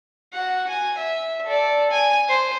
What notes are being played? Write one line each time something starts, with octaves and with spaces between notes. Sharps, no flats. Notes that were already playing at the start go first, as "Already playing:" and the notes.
F#4 F#5
G#5
E5
A4 D5
G#5
C5